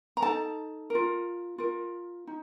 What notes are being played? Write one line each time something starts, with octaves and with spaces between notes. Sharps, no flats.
A#5
D#4 A4 A5
F4 A#4
F4 A#4
D#4